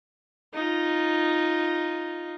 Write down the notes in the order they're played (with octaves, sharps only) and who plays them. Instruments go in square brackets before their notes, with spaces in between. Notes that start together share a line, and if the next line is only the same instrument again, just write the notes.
[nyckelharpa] D#4 F4